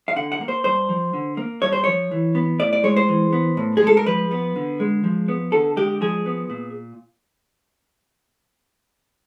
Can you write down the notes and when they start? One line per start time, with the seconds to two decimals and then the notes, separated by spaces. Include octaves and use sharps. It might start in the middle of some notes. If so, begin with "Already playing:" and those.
0.08 F5
0.16 D3 F#5
0.32 F#5
0.41 A#3
0.48 C5
0.64 G2 C5
0.89 F3
1.13 D3
1.37 A#3
1.62 G2 C#5
1.73 C5
1.84 F3 C#5
2.11 E3
2.35 B3
2.59 A2 D5
2.73 D5
2.84 G#3 C#5
2.96 C5
3.08 E3
3.33 B3
3.57 A2
3.77 G#4
3.82 G#3 A4
3.97 A#4
4.06 F3 B4
4.31 B3
4.56 D3
4.80 G#3
5.04 F3
5.28 B3
5.52 D3 A4
5.77 G#3 G4
6.01 F3 G#4
6.26 B3
6.50 A#2